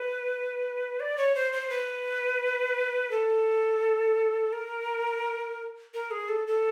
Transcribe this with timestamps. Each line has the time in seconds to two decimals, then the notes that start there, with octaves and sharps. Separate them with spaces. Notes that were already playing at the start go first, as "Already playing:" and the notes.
Already playing: B4
1.00 D5
1.17 C#5
1.35 C5
1.53 C5
1.70 B4
3.11 A4
4.53 A#4
5.94 A#4
6.11 G#4
6.29 A4
6.47 A4